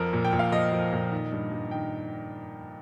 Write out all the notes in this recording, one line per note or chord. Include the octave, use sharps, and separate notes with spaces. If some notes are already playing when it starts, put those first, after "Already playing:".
Already playing: F2 F3 A#4
A#2
G5
A#2
F5
F3 D#5
F3
A#2
D#3
G2
G2
D#3 G5